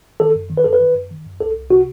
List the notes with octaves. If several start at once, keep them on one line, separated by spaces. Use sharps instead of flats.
D#3 A4
F#2
D#3
B4
F#2 A4
B4
D#3
F#2
D#3
F#2
C2 A4
C2
C3 F#4